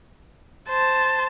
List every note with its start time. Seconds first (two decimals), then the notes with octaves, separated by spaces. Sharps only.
0.69 C5 A5